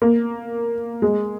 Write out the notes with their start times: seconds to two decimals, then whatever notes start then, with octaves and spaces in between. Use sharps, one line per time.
0.02 A#3
1.02 G#3